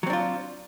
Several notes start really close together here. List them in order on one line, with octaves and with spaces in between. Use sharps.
F#3 C4 D4 F4